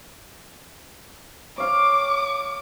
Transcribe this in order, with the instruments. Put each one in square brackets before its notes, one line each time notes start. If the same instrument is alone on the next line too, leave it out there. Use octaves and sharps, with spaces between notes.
[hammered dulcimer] C#5 F5 [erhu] D6